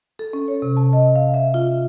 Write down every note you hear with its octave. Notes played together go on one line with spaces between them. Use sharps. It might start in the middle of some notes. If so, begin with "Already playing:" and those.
A4
C#4
C#5
C3
A5
D#5
F5
E5
F4